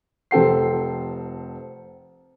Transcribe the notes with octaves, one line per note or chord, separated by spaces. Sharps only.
F1 C4 A4 G5 C7